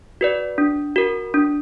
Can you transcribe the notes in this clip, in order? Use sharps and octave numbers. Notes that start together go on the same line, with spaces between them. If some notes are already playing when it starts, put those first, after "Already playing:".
F#4 B4 D5
D4
F#4 A#4
D4